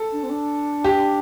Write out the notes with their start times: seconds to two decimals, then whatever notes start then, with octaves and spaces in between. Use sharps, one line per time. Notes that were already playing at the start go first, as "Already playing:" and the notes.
Already playing: A4
0.12 D4
0.23 C4
0.30 D4
0.84 G4